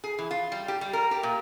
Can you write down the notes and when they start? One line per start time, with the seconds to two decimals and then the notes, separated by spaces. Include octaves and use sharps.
0.04 G#4
0.19 E3
0.31 F4
0.52 G3
0.68 G4
0.81 G3
0.93 A#4
1.11 G4
1.23 A#2